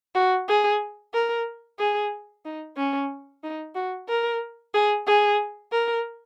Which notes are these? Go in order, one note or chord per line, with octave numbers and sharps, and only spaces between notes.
F#4
G#4
A#4
G#4
D#4
C#4
D#4
F#4
A#4
G#4
G#4
A#4